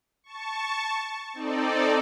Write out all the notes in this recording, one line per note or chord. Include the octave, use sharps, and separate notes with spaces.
A5 C#6
C4 D#4 A4 D5